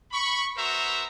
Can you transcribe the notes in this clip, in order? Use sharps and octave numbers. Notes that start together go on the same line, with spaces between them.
B5 C#6
B3 F#4 A#4 C5 E5 A#5